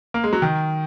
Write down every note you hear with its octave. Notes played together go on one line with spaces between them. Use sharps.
A#3
G#3
F#3
D#3